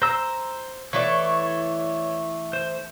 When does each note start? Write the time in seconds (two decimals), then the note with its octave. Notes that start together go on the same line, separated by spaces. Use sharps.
0.02 C5 A#5 E6
0.93 E3 A3 C#5 D5
2.53 C5